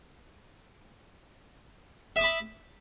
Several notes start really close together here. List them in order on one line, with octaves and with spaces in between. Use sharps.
E5 D#6 D6 B5